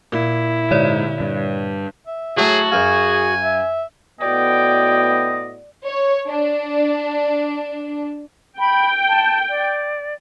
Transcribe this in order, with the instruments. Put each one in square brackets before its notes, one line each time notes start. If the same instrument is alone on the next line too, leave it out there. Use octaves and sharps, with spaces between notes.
[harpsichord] A#2 [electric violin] E4
[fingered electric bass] G#2 [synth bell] D3 C#5 D5
[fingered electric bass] G2
[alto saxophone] E5
[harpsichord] A2 F#3 [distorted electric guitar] F#4 [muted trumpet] G#4 [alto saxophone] A5
[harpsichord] F#2 F5 [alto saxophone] G#4 [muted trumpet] G#5
[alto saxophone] E5
[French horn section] A2 B3 F#4 [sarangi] D5 [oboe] D#5 [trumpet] G5
[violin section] C#5
D4
[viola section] G5 [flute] B5
[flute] A5
D5